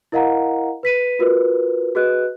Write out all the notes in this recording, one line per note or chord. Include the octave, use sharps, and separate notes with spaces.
E4 A#4 D#5 F5 F#5 A#5
B4 B6 D#7
F4 F#4 A#4 B4
F#4 G#4 B4 D#5 F#6